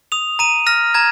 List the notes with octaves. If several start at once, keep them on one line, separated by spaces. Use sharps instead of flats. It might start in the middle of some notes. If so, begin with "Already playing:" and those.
D#6 F7
A#5 D#7
F6 A#6
A#5 G#6